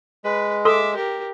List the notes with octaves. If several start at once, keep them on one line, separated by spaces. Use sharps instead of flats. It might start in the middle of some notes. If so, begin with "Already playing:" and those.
G#3 B4
A4 E5 C6 D6 D#6
G4 A#4